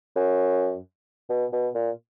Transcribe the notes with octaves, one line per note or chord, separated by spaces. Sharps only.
F#2
B2
B2
A#2